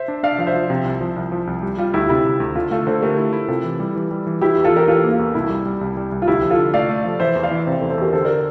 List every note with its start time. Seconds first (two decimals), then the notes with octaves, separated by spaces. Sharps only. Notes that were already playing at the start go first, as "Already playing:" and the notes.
Already playing: C5 E5
0.08 D4
0.23 D4 D5 F5
0.38 F3 F5
0.47 C5 E5
0.55 F3
0.70 C3
0.85 C2
1.01 F3
1.16 C2
1.32 F3
1.47 C2
1.62 G3
1.78 G3 F4
1.94 D2 E4 G4
2.09 C3 E4
2.25 C3
2.40 D2
2.55 D3 F4
2.71 A3 F4 A4
2.87 D3 A4 C5
3.02 A3 G4 A#4
3.18 E4
3.33 E4
3.48 C3 F4 A4
3.64 E3
3.80 G3
3.96 E3
4.11 G3
4.27 E3
4.41 E3 E4 G4
4.57 E2
4.64 F4 A4
4.72 E3 G4 A#4
4.88 E3 F4 A4
5.04 A#3
5.11 F4
5.19 E2
5.35 C2 E4
5.50 G3
5.66 G3
5.81 C2
5.97 G3
6.12 C2
6.22 F4
6.27 D2 E4 G4
6.43 F3
6.51 F4 A4
6.59 D3
6.74 A3 D5 F5
6.89 A3
7.05 F3
7.20 E3 C5 E5
7.36 E2
7.43 D5 F5
7.51 E3
7.66 C3 C5 E5
7.78 A4 C5
7.82 E2
7.90 A4 C5
7.98 E2 G4 A#4
8.13 D3 A4 C5
8.25 A#4 D5